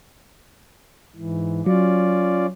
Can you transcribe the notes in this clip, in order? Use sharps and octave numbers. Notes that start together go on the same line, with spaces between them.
G#2 E3
F#3 C#4 F4 D5